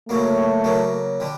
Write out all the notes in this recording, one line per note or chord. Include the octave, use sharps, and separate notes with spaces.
C#3 F#3 A3 A#3
C#3 F#3 A#3
D3 G3